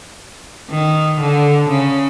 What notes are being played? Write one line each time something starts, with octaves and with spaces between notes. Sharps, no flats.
D#3
D3
C#3